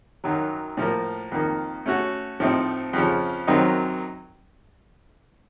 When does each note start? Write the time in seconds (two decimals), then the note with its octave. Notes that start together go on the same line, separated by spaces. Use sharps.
0.24 F#2 D#3 F#3
0.77 A2 F3 A#3
1.32 F2 D#3 A#3
1.86 A3 C#4 F#4
2.40 A2 F3 A3 C4 D#4
2.93 F2 C#3 F3
3.47 F#2 D#3 F#3 C4 D#4